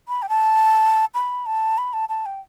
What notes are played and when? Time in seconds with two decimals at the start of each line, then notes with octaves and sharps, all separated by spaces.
0.08 B5
0.22 G5
0.29 A5
1.14 B5
1.46 A5
1.78 B5
1.93 A5
2.09 A5
2.26 G5